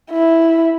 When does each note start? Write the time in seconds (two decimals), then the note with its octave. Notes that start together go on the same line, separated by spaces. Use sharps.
0.11 E4